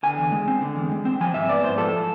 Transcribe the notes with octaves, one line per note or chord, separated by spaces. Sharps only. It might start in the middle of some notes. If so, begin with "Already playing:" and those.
D3 G#5
E2
G#3
C4
D3
E2
G#3
C4
F3 G#5
G#2 E5
B3 D5
G#2 C5
F3 A4